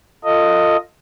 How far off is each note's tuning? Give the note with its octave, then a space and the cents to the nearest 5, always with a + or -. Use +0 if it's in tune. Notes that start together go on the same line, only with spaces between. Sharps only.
F4 +0 A4 +35 D#5 +0